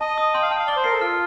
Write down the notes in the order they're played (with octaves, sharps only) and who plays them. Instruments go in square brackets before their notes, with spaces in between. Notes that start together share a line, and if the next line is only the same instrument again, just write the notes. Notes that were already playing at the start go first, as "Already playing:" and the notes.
[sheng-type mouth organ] D#5 [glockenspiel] A5
[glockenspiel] D#6
[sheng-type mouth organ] G5 [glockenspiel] C6
[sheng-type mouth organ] F5
[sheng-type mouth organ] G5 [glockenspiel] A5
[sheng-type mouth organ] F5
[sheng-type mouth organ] D5 [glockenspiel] G7
[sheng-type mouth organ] C5
[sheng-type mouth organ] A#4 [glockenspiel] C7
[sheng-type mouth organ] A4
[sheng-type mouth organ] F4 [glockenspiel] F6